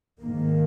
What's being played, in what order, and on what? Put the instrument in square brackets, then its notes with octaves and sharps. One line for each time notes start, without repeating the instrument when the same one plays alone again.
[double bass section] G#2 D#3 A#3